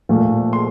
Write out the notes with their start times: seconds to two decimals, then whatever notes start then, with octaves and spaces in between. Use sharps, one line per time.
0.09 A#2 F3 A3
0.53 C6